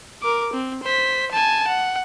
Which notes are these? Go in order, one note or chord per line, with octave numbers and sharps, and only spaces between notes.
A#4 D6
C4
C5 B6
G#5 A5
F#5